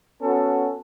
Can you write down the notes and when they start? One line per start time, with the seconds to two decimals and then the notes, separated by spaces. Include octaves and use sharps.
0.20 B3 C#4 F#4 A4